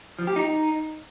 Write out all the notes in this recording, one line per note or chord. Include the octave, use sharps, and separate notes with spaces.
F3
G4
D#4